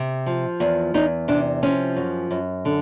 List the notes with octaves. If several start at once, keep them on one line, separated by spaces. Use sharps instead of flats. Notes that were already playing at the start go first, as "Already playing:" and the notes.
Already playing: C3
F3
E2
E2 D#4
C3 D4
F3 C#4
F#2
F#2
D3